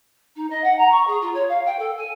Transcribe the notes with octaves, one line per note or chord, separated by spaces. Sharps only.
D#4
D#5
F#5
A#5
C#6
G#4
F4
C#5
F5
G5
A4
G#5